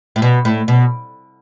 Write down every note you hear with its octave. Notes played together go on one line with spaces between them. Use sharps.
A2
B2
A2
B2